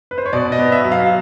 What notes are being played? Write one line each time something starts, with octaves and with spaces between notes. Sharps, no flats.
B4
C5
C#5
B2 D5
D#5
B3
E5
F#3
F5